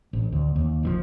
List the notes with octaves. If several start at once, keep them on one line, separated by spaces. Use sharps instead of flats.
A1
D2
D#2
F#1 C#3 F3